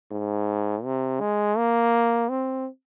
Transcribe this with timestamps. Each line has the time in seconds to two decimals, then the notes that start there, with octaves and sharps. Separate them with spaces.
0.11 G#2
0.84 C3
1.20 G#3
1.57 A#3
2.29 C4